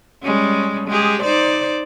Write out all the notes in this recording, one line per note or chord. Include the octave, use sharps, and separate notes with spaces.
G3 G#3 C#4
G#3 G4 G#4
D#4 C5 D5